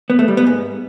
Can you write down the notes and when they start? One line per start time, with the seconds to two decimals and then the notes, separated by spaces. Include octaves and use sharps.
0.10 B3
0.19 A3
0.28 G3
0.37 B3
0.47 G#2